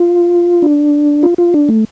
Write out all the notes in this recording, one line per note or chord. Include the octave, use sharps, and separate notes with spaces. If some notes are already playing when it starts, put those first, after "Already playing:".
Already playing: F4
D4
F4
F4
D4
A3